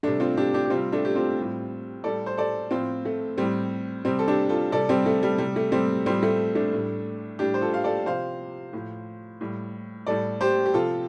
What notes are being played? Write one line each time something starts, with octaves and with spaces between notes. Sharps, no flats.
C3 G3 A3 D4
C4 F4
D4 G4
D4 G4
G4
C3 G3 C4 F4
A3 D4
G4
C4 F4
A2 G3
A2 G3 A4 D5
C5
A4 D5
A2 F3 C4 F4
A3
A2 G3 C4
C3 G3 C4
A4
D4 G4
F4 A4
C3 G3 A4 D5
G3 C4
A3
G3
C3 G3
A3
G3 C4
A2 F3 G3 C4
A3
A3 D4
A2 G3
A2 G3 D4 G4
C5
F4 A4
F5
A4 D5
C3 F3 C5 F5
A2 F3
A2 G3
A2 G3 A4 D5
G4 C5
G4
C3 F3 F4 A4